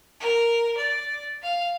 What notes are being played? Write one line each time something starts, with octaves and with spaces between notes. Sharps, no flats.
A#4
D5
F5